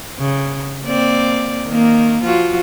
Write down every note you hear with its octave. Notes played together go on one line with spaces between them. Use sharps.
C#3
A#3 C4 D5
D#3 A#3
F3 F4 F#4